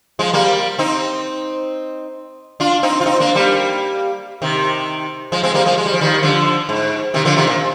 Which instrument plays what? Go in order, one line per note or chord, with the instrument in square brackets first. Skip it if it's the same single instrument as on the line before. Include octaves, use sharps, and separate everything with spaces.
[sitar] F3 G#3
G3 A#3
C4 D#4
D4 F4
C4 D#4
F4
C4 D#4
A#3 D4
G3 A#3
C3 D#3
F3 G#3
G#3 C4
G3 A#3
F3 G#3
G#3
G3
F3
D#3 G3
D3 F3
G#2
C3 D#3
D3 F3
C3 D#3
A#2